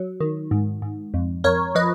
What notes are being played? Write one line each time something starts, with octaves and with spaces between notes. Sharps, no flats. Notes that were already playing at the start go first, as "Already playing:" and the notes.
Already playing: F#3
D#3
G#2
G#2
F2
F2 A#4 C#5
F3 B4 D#5